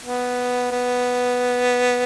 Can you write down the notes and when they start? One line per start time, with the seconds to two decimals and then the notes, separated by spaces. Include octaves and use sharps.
0.05 B3
0.71 B3